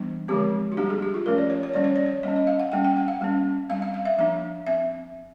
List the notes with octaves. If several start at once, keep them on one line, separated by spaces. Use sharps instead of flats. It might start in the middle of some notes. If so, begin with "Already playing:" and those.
Already playing: E3 G3 B3 D4
D3 F3 G#3 C4 G4
F#4
G3 A#3 D4 G4
G#4
G4
F4
F3 A3 C#4 A#4
D5
C#5
C#5
D#3 G3 A#3 C#4 D5
C#5
D5
C#5
G3 A#3 C#4 D#5
D#5
F5
F#5
G3 A#3 C#4 G5
G5
F#5
F5
G3 A#3 C#4
G3 C4 F5
F5
F5
E5
F3 A#3 D4 E5
C4 E5